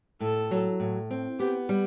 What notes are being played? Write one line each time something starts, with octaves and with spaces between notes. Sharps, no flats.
A2 A4
F#3
A2
C4
B3 G4
G3